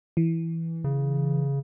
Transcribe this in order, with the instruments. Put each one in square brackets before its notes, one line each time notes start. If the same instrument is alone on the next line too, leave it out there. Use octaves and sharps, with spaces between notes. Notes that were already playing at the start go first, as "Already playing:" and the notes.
[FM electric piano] E3
[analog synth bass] C#3